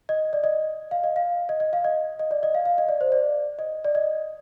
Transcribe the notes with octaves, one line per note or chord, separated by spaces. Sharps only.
D#5
D5
D#5
F5
D#5
F5
D#5
D#5
F5
D#5
D#5
D5
D#5
F5
F5
D#5
D5
C5
D5
D#5
D5
D#5